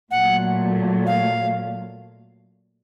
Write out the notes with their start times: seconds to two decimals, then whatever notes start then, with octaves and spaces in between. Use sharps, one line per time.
0.11 A#2 F#3 A3 F#5
1.06 F5